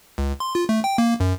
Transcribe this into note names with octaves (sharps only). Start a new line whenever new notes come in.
C#2
C6
F4
A3
G5
A#3
F#2